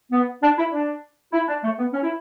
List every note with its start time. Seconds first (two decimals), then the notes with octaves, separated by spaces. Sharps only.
0.12 B3
0.42 D4
0.58 E4
0.73 D4
1.33 E4
1.48 D4
1.63 A3
1.79 B3
1.93 C#4
2.03 E4